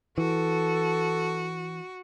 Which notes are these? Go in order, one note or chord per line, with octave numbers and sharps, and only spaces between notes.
E3 F#4 A4